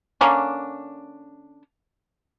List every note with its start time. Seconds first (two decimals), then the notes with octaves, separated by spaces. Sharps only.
0.21 D3 A#3 C#4 D4